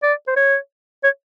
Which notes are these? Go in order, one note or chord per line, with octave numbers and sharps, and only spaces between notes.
D5
C5
C#5
C#5